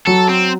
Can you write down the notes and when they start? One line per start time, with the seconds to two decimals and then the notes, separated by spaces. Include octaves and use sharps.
0.07 F#3 A4
0.29 C4